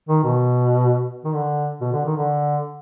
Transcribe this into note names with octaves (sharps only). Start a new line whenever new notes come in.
D#3
B2
D#3
D3
B2
D3
D#3
D3